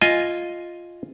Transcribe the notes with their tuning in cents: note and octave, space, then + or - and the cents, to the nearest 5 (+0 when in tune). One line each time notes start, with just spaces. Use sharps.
F4 +0 D#5 +0 G#5 +0